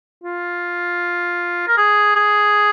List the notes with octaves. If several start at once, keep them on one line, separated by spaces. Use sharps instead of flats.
F4
A#4
G#4
G#4